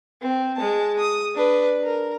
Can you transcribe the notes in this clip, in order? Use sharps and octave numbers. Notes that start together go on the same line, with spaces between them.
C4
G#3 A5
D#6
D4 B4
A#4